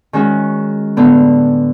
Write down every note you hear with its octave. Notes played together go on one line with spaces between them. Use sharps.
D#3 G#3 C#4 F#4
A2 D3 B3